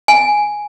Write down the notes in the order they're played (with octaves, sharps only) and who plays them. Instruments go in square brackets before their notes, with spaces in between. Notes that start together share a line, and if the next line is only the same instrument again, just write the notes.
[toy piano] G#5